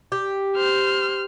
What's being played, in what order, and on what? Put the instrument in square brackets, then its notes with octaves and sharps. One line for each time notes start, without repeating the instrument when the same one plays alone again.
[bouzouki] G4
[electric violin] C5 F6